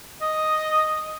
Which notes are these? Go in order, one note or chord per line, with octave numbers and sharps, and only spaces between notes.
D#5